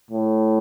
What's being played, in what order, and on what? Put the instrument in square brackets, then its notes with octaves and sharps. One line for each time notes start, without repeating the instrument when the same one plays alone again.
[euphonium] A2